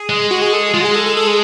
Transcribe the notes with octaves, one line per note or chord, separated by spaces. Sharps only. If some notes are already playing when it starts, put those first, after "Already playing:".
Already playing: G#4
G#3
F#4
G#4
A4
G#4
G#3 F4
F#4
G#4
A4
A4
A4
G#4